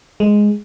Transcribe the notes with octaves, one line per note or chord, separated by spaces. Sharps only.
G#3